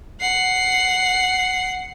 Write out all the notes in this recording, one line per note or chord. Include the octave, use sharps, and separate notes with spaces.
F#5 C7